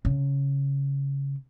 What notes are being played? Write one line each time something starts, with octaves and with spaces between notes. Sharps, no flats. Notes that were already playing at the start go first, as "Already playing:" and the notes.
C#3